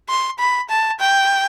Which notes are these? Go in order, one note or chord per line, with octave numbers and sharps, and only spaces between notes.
C6
B5
A5
G5